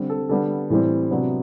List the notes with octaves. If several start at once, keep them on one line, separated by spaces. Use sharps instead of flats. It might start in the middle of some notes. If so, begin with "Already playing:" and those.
Already playing: D3 G3 C4
A4
D3 G3 B3 A4
A2 E3 G3 C4
C3 F#3 B3 D4